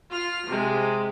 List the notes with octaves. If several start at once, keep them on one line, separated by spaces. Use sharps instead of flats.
F4 F6
C3 G#3